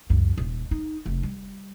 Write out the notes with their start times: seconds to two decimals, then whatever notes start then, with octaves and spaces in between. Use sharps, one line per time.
0.10 C#2 F#2
0.38 D#1
0.71 D#4
1.06 F1
1.23 G3